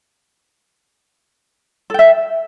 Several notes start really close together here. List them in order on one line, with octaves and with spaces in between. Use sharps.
A4 G5 E5